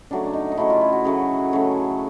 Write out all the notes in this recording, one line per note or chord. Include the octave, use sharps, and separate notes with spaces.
C#3 F#3 A3 D4
D4
D#4
D#4
C#3 F#3 A3 E4
F4
E4
F#4
C#3 F#3 A3 G#4
C#3 F#3 A3